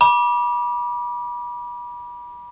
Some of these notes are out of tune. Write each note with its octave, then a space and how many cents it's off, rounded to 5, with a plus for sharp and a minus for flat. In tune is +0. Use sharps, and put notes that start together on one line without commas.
B5 -35 D6 +0